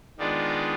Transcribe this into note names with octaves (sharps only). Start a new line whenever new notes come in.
D#3 G#3 B3 D4 F4 D5